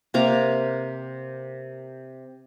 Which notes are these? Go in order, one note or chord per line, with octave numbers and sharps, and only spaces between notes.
C3 A#3 F5 D6